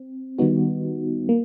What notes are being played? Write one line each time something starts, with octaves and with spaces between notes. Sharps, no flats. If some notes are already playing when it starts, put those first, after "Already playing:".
Already playing: C4
D#3 G3 B3 D#4 F#4
A#3